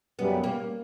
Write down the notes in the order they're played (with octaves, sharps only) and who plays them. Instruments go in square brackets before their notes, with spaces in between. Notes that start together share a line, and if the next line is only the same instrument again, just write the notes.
[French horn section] F#2 C#3 G3 [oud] B3
[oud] A#3